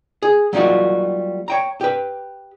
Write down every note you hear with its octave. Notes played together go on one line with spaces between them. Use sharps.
G#4
F#3 G3 A#3 D#4 F4 F#4
C#5 G5 A#5
G4 B4